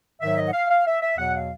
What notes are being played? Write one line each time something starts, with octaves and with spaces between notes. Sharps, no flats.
G#2 D#3 F#3 E5
D#5
F#5
F5
F5
E5
E5
E2 B2 F#3 F#5
F5